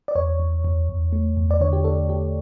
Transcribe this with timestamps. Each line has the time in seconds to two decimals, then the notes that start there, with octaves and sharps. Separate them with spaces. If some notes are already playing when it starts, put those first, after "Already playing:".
0.08 D5
0.15 E2 C#5
0.40 E2
0.65 E2
0.89 E2
1.13 A3
1.37 E2
1.51 D5
1.61 D3 C#5
1.73 G4
1.84 D3 A4
2.09 E2 G4